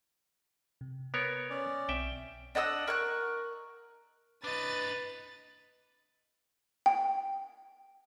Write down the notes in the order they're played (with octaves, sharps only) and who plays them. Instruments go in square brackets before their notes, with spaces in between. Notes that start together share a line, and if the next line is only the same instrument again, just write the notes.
[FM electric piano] C3
[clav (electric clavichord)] B3 A#4 C#5
[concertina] C#4 D5
[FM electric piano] B1 C4 [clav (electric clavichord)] E5 G5
[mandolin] D4 D#5 F#5 E6
A#4 C#6 F#6
[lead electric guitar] D4 D#5 [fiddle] B4 [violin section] A6
[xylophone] G5